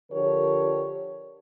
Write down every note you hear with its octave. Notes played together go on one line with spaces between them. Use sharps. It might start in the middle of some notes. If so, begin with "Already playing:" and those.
D3 F3 G4 A#4 C#5